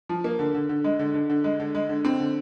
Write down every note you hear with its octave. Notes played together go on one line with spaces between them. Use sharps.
F3
A#3
D3
D3
D3
G#3
D3
D3
D3
G#3
D3
G#3
D3
C4
D3